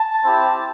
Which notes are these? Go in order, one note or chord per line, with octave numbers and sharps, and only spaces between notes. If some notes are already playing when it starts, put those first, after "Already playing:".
Already playing: A5
C4 E4 G4